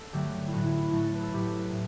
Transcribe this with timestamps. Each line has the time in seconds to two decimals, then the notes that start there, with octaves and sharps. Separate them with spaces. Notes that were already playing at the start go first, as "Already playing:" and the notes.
Already playing: A4
0.12 G2 D3 F#3 A3 G4
0.48 E4
0.53 A2 F#3 A3 F#4
0.66 E4
0.80 E4
0.92 A2 F#3 A3 F#4
1.04 A4
1.14 B4
1.23 A4
1.33 A2 F#3 A3 G4
1.72 A2